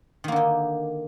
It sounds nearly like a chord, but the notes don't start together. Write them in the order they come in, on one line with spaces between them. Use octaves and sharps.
D#3 A#3 D3 D#4